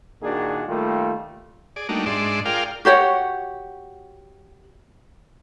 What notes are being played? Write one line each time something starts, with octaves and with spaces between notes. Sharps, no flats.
A#2 D#3 A#3 D4 F#4 G#4
D#3 G3 A3 A#3 F4
G#4 D5
G3 A3 A#3 D4 D#4 F#4
G#2 G#3 D4 D5 E5 C6
F4 G#4 A#4 D5 F5 G5
F#4 G4 C#5 F#5